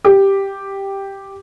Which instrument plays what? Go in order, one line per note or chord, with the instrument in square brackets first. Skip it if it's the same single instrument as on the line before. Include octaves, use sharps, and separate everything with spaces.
[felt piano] G4